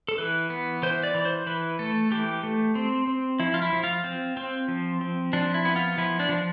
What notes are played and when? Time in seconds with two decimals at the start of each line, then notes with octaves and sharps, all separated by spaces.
0.08 A4
0.18 E3 B4
0.50 B3
0.83 E3 C5
1.03 D5
1.15 E3
1.25 C5
1.47 E3 B4
1.79 A3 A4
2.11 E3 G4
2.43 A3
2.75 C4
3.08 C4
3.40 F3 E4
3.54 F4
3.62 E4
3.73 F3
3.84 F4
4.04 C4
4.37 C4
4.68 F3
5.01 C4
5.33 F3 D4
5.54 E4
5.65 B3
5.76 F4
5.98 F3 E4
6.20 D4
6.29 F3